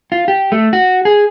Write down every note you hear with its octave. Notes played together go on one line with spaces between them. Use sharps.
F4
G4
A3
F#4
G#4